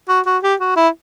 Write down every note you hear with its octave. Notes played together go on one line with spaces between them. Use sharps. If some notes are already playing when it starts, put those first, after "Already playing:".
F#4
F#4
G4
F#4
E4